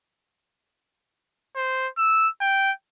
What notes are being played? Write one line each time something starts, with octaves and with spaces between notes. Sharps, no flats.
C5
E6
G5